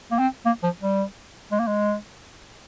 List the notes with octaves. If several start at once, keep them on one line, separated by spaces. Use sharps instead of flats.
A#3
C4
A#3
F3
G3
G#3
A#3
G#3